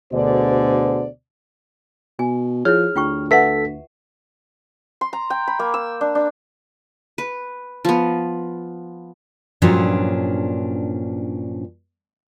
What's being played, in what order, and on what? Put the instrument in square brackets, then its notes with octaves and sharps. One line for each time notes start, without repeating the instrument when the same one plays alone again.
[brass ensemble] D2 B2 D3 G#4 C5 D5
[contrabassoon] B2 [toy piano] G#5
[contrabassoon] F3 [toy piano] E4 C#5 [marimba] G#4 [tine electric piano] F6
[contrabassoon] D2 [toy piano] F4 G5 C#6
[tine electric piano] A4 B6 [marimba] B4 F#5 [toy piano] E5
[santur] C6
A#5
G5
B5
A#3
E6
D4
D4
[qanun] B4
F3 B3
[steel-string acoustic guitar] G2 A#2 F3 F#3 C#4 D4